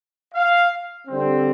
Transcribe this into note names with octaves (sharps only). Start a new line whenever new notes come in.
F5
D3 G3 C4